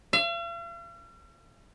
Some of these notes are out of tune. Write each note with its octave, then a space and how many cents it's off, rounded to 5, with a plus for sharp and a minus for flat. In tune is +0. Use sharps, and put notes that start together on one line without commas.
F5 -45